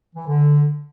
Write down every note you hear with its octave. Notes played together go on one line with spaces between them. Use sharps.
E3
D3